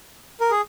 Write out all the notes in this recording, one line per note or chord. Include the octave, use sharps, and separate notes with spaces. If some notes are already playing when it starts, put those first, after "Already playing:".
A#4
G#4